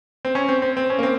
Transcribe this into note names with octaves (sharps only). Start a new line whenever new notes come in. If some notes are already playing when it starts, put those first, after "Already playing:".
C4
C#4
C4
C4
C4
C#4
A#3
C4